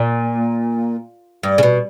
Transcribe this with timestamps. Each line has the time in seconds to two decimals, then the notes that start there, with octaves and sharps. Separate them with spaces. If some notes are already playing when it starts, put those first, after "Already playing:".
Already playing: A#2
1.43 G2
1.58 C#3
1.63 B2